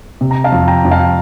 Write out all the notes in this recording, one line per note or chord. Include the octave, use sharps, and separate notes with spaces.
C3
A#5
F5 A5
F2
G5 A#5
F2
F5 A5